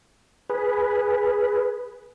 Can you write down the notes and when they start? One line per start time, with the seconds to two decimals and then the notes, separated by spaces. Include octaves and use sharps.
0.50 G#4 B4